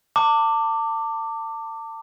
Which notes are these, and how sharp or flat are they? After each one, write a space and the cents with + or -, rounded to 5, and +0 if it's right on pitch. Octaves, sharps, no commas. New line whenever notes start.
A5 +35 D6 +0